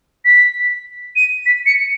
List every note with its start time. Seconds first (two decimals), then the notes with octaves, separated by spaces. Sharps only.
0.25 B6
1.16 D#7
1.46 B6
1.66 C#7